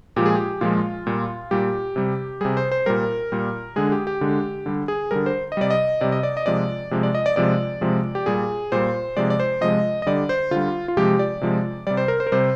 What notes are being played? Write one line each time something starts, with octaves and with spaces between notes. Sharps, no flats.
A#2 F3 G#3 G4
G#4
G4
A#2 F3 G#3 F4
A#2 G3
A#2 G3 G4
C3 G3
C3 G3 G#4
C5
C5
A#2 G3 A#4
A#2 G3
D3 G#3 G#4
G4
G4
D3 G#3
D3 G3
G#4
D3 G3 A#4
C5
D#5
C3 G3 D5
D#5
C3 G3 D5
D#5
D5
D#5
C3 F3 G#3 D5
C3 F3 G#3
D5
D#5
D5
C3 F3 G#3 D5
C3 F3 G#3
G4
A#2 G3 G#4
A#2 G3 C5
C3 F3 G#3 D5
D5
C5
C3 F3 G#3 D#5
D#5
D3 G3 D5
C5
D3 G3 F4
F4
C3 F3 G#3 G4
D5
C3 F3 G#3
C3 G3 D5
C5
A#4
C5
A#4
C3 G3 C5